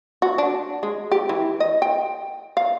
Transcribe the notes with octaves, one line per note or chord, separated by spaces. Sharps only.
F#4
D4
G#3
G4
E3
D#5
G5
F5